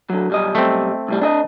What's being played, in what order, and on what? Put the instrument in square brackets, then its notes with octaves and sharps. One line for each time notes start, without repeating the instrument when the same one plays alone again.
[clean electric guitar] D3 F#3
B1 G3 D#5
[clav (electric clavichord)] A3 C4
[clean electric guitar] C2 A2 G3
D4 G#4 D#5